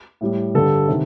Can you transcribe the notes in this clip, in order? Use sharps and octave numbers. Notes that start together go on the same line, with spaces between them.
A2 G3
G2 D3 G3 A4
C3 D#3